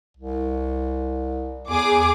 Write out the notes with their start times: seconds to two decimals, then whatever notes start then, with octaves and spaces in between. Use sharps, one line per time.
0.17 C2
1.69 E2 G#4 D6